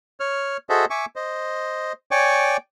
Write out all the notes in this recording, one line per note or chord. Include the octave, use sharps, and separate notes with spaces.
C#5 F6
F#4 G#4 A4 C5 D#5 E5
E5 G#5 C#6 D6
C5 D#5
C#5 D5 G5 G#5 C#6 D6